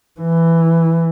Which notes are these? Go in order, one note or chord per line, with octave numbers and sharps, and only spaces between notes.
E3